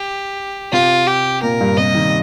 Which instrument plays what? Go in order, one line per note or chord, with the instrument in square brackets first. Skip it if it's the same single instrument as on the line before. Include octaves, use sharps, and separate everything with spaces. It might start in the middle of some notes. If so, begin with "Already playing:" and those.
Already playing: [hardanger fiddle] G4
[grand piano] C3 [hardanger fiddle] F4
[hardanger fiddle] G4
[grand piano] A#2 [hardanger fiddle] A#4
[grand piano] G2
[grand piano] C3 [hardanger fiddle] D#5
[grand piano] D#3